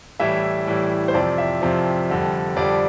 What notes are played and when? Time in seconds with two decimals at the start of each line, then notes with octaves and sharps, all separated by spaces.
0.20 A2 E3 G3 E5
0.67 A2 E3 G3
1.08 C5
1.14 F2 C3 F3 D5
1.38 E5
1.62 F2 C3 F3
2.09 F2 D3 G3
2.56 F2 D3 G3 D5